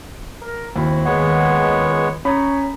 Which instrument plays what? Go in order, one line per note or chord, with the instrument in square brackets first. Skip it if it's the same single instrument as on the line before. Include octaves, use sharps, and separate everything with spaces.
[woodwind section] A#4
[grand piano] D#2 [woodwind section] C4 E4 F#4
[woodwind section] C#2 D#3 [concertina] G#3 B3 C#5 [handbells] F#5
[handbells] C#4 A#5 [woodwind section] C#5 [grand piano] B5